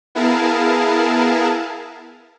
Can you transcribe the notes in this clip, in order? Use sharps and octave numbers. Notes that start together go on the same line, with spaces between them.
B3 E4 G#4 A#4 F5 A5